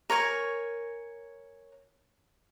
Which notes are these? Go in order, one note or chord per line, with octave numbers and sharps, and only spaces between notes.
A#4 C#5 G#5 C#6